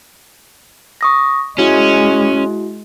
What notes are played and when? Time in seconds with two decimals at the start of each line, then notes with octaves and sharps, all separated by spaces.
1.01 C#6 D#6 A#6
1.58 G#3 C#4 E4 F#4